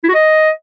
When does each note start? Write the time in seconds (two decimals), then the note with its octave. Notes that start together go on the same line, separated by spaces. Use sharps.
0.04 E4
0.09 F#4
0.14 D#5